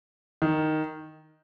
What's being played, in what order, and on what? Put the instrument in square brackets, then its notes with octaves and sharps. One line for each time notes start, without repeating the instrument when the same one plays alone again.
[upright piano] D#3